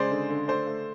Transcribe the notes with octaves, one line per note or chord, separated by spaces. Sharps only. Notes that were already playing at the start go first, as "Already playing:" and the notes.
Already playing: C#3 G#3 C5 D5
D3
D3
A3 C5 D5
A3